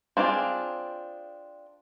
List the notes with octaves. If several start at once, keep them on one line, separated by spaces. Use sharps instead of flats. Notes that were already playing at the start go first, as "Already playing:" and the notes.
C4 D4 D#4 F4 G#4